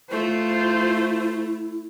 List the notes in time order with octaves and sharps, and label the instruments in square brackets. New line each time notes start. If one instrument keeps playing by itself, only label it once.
[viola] A3 [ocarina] E4 [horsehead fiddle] F4 C5